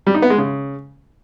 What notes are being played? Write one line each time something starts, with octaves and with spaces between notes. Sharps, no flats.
G3
D#4
B3
G#3
C#3